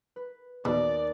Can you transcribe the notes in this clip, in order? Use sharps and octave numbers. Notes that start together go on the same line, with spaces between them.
B4
D#2 B2 A#4 D5 D6